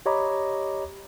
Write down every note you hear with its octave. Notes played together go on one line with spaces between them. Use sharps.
G4 C#5 D#5 A#5 B5 D6